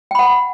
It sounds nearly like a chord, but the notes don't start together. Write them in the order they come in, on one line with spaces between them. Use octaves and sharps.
G5 B5 F#5